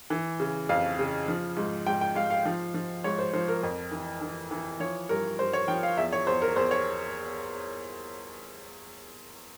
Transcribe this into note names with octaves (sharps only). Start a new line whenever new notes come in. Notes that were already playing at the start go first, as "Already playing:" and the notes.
E3
C#3
F2 F5
C#3
F3
G#2
G#2 G5
G5
G#2 F5
F5
F3
F3
G#2 C#5
C5
F3 C5
A#4
F2
E3
E3
E3
F3 C#5
G2 A#4
G2 C5
C#5
F3 G5
F5
E2 E5
C#5
E2 C5
A#4
E2 C5
C#5